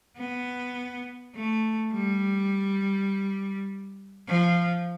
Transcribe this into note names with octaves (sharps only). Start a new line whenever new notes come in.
B3
A3
G3
F3